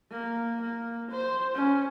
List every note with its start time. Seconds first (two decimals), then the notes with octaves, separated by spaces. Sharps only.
0.11 A#3
0.61 A#3
1.11 C5
1.55 C#4